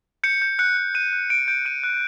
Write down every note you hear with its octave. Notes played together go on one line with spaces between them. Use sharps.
G6 C#7
G6
F#6 C#7
F#6
F#6 D#7
F#6
G6 D7
G6 D7
F#6 D#7
F#6